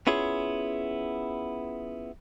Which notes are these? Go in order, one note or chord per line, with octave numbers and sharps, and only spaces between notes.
B3 C#4 E4 F4 G#4 C#5